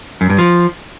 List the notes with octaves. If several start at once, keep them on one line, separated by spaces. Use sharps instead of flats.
F#2
G2
F3